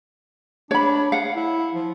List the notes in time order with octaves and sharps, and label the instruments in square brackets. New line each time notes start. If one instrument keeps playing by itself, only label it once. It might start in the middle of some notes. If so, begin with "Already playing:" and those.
[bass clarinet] D4 [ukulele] C#5 B5
[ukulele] F5 F#5
[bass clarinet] E4
F3